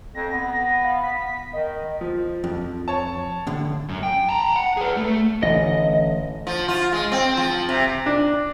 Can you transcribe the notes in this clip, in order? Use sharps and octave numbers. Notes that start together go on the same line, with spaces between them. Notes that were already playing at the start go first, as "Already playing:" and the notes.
F2 A#6
B3
F5
B6
D#3 D#5
F3
F2
C#5 A5
A2 D3
F#2
G5
A5 A#5
F#5
G#4 B4
A3
A1 D3 D#5
F3
F4
G#3
C4
F3
C3
D4